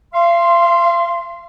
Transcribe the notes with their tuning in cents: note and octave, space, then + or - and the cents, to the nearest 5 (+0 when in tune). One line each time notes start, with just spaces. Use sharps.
F5 -40 C6 +0